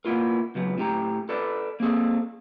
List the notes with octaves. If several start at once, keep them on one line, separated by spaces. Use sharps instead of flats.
A#3 B3 E4 F4 A#4
C#2 F#3 B3
A2 G4 A#5
A4 B4 D5
A#3 C4 G#4 A4